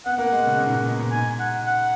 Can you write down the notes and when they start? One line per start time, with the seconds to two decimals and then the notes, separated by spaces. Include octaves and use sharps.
0.06 B3 F#5
0.18 A#3
0.32 G#3
0.46 C#3
0.52 B2
0.59 A#2
0.66 G#2
0.72 A#2
0.85 B2
0.99 A#2
1.12 G#2 G#5
1.39 F#5
1.65 F#5